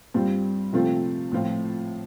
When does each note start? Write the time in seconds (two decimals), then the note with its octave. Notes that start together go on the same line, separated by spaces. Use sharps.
0.14 G2 G3 C4 F4
0.73 C3 F3 A3 C4 F4
1.32 A2 F3 C4 F4